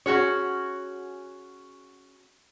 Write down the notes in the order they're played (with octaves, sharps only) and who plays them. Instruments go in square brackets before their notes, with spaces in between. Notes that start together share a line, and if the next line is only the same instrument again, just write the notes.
[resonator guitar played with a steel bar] C#4 F#4 G#4 C#5